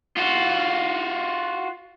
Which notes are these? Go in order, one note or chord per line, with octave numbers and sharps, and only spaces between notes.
F4 F#4